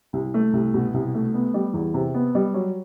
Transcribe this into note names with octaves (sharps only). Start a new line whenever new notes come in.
C2
A3
C2
B2
C2
A3
B3
G3
E2
C3
B3
G3
F#3